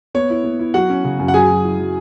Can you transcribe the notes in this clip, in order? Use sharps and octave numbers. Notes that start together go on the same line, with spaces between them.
B3 C#5
E4
B3
E4
F#3 F#4 F#5
C#4
C#3
F#2
F#5
F#3 G#4 G#5
F#3
E4
F#3